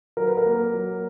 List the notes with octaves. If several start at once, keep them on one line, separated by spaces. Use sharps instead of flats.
F#3 A#4
B4
A#4
A#3
F#3